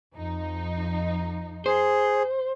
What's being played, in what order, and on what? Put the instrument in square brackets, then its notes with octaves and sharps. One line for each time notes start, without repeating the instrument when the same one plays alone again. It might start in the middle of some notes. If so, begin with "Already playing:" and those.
[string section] F2 F3 D#4
[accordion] G#4 [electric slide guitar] C5